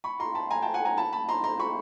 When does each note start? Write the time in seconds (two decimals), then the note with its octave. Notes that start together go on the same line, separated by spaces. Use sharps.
0.04 B5 C#6
0.20 A#5 C6
0.35 A5 B5
0.50 G#5 A#5
0.62 G5 A5
0.74 F#5 G#5
0.85 G#5 A#5
0.97 A5 B5
1.13 A5 B5
1.28 A#5 C6
1.44 A#5 C6
1.59 B5 C#6